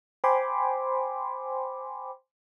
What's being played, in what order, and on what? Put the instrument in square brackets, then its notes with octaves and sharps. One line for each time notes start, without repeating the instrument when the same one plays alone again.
[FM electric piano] C5 G5 G#5 B5 C6 D6